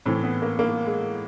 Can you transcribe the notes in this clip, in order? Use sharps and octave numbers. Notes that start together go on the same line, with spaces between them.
A2 E3 C4
B3
A#3
A#3
G#3